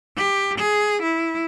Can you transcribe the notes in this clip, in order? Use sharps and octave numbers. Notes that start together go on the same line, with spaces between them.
G4
G#4
E4